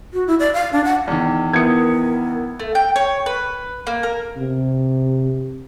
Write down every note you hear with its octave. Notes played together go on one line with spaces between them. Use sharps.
F#4
E4
D5
F5
D4
F#5
E2 D#3
B3 E4 A#4 D#6 G#6 C#7
A3
G5
C#5
B4
A#3
A#4
C3